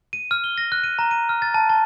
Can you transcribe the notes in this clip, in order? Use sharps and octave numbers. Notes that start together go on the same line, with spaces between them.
D#7
F6
G7
A#6
F#6
D#7
A#5
D#7
F6
A6
A5
A5